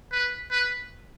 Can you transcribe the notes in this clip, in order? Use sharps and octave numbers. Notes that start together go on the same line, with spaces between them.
B4
B4